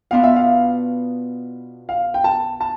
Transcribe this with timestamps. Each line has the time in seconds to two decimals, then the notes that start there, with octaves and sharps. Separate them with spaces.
0.11 B2 B3 D4 F4 F5
0.23 E5
0.36 F5
1.89 F5
2.14 G5
2.24 A5
2.61 A5